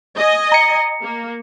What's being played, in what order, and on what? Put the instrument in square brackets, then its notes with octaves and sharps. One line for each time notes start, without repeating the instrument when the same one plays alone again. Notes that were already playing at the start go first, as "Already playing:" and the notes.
[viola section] D#5 G#5
[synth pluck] A#5 C#7
[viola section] A#3